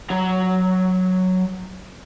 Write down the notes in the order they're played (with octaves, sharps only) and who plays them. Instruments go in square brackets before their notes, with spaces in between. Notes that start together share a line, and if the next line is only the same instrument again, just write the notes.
[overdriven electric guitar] F#3 A#5